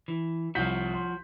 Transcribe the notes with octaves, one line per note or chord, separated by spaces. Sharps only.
E3
C2 F3 F#4 G6 B6
C6